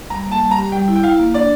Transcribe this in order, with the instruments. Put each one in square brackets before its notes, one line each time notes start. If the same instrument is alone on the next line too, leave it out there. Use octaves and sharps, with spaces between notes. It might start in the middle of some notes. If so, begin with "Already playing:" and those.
[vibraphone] G3 [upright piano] A#5
[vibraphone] A#3
[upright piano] A5
[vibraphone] G3
[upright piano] A#5
[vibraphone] G4
[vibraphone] G3 [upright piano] G5
[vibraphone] E4
[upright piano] G5
[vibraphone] E4 [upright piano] F5
[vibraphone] A#3
[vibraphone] D4 [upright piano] D5